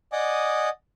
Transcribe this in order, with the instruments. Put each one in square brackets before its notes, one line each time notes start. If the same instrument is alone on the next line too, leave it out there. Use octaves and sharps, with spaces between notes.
[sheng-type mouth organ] D5 D#5 F#5 G#5 D6 D#6